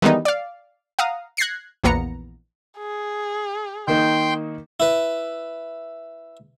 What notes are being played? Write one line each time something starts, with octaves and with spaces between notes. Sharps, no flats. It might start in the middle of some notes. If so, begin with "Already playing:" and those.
D#3 E3 G3 G#3 B3 D#4
D5 F5
F5 F#5 A#5 D#6
F#6 G#6 A#6 C7 C#7
A#1 E2 A#3 B3 A#5 C#7
G#4
D#3 A#3 D#4 G5 C6 G6
E4 B4